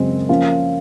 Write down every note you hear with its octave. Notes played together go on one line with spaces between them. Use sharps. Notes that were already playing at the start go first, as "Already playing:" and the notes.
Already playing: F#2 C#3 G#3 C4
F3 A#3 C#4 F4